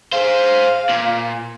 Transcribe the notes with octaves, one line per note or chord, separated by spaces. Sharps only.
G#4 C5 F5
A#2